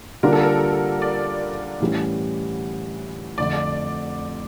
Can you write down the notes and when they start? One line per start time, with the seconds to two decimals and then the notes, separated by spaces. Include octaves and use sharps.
0.23 D3 G3 A#3 D4 F4 A#4
0.32 A4
0.43 A#4
1.02 D5
1.81 A2 E3 G3 C#4
3.38 F2 D3 A3 D5